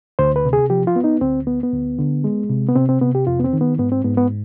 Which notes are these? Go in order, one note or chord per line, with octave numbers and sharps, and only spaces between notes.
D2 C5
B4
C3
G#4
F3 G4
F4
B3
D#4
D2 C4
B3
B3
D2
D3
G#3
C3
B3
C3 C4
C4
C3 B3
G4
F2 F4
B3
C4
D#3
B3
G#2 B3
C4
G#2 B3
B3